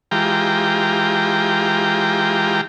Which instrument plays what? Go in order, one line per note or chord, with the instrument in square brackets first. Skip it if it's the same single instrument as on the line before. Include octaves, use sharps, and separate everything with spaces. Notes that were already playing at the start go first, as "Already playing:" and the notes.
[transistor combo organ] E3 G#3 F4 G4 G5 A#5